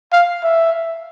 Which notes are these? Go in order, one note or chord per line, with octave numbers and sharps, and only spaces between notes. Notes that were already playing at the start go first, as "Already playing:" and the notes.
F5
E5